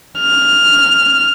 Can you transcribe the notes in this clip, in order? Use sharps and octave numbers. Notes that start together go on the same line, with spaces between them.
F6